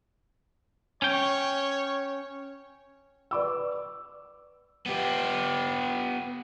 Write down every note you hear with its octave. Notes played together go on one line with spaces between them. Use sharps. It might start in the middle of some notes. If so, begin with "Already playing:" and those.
C#4 C#5 G5
B4 D5 D6 E6
B3 G4